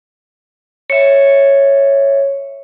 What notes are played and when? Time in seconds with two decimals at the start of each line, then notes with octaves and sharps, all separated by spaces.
0.90 C#5 E5